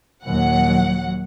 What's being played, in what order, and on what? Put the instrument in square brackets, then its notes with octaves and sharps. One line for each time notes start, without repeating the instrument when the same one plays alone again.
[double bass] D#2 A#2 [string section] F#3 F#5